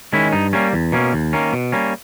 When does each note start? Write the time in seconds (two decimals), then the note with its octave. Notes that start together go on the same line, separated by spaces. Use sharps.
0.13 D#3 G#3 C#4 E4
0.32 G2 D#4
0.53 G3 A#3 C#4
0.73 E2
0.92 B2 A#3 C#4
1.13 D#2
1.33 D#3 A#3 C#4
1.53 B2
1.72 G3 A#3 C#4